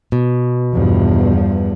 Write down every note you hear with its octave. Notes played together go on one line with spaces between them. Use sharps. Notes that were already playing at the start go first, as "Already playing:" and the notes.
B2
E2 G2 F3